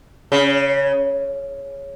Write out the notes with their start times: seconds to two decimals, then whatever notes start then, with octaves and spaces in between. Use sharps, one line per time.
0.32 C#3